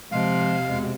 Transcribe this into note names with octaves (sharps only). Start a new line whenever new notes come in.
C3 F3 G#3 F5
E2 B2 G#3